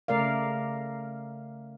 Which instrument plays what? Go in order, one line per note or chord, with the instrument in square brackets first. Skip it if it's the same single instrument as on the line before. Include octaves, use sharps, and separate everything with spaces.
[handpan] C#3 A3 A#4 D5 F5